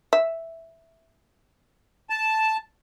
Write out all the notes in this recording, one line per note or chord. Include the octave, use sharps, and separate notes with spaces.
E5
A5